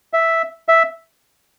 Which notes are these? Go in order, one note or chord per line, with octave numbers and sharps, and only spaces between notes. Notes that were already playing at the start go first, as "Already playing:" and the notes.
E5
E5